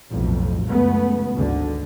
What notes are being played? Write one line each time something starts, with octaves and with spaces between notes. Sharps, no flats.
B1 F2 A2
C#2 F#2 A3 B3
G#1 D2 D3